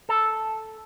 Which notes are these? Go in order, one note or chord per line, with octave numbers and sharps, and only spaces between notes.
A4